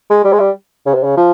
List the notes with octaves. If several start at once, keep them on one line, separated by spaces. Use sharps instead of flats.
G#3
G3
G#3
G3
C#3
C3
C#3
F3